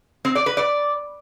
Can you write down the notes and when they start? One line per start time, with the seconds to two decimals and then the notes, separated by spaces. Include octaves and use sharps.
0.25 C4
0.35 D5
0.46 B4
0.57 D5